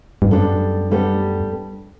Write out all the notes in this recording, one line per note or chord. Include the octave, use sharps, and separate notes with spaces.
G2
F#2 G3 B3 D4 A4
G3 B3 D4 A4